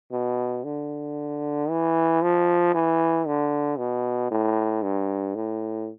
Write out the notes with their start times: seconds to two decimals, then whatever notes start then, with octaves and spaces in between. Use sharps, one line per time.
0.12 B2
0.64 D3
1.70 E3
2.22 F3
2.74 E3
3.27 D3
3.78 B2
4.31 A2
4.83 G2
5.35 A2